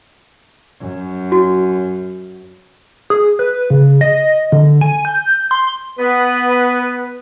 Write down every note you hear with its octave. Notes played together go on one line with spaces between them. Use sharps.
F#2
F#4
G#4
B4
C#3
D#5
D3
G#5
G6
C6
B3 B4